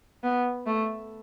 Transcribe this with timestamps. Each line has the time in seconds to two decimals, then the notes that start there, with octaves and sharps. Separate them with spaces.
0.23 B3
0.66 A3